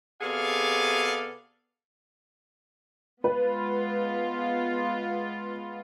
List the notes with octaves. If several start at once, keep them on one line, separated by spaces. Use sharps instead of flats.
C3 B3 G#4 A4 D5 F5
G#3 B3 F4 B4